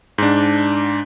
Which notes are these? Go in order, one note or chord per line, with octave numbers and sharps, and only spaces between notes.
G#2 D4